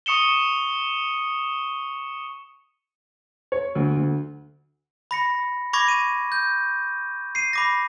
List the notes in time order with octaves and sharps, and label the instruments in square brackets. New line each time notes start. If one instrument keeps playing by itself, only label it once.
[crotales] C#6 D#6 C#7 E7 G7
[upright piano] C#5
D2
D2
[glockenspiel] B5 A#6 C#7
B5 C#6 D6 G#6 A#6
D#7
G6
C7 D#7
B5 D6 A#6